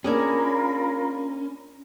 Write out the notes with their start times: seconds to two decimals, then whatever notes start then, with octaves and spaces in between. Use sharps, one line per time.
0.04 A#3 C#4 D4 F4 G#4 A#4 B5